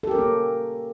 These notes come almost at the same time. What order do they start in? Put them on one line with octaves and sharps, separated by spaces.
A4 G4 A#4 C#4 A#3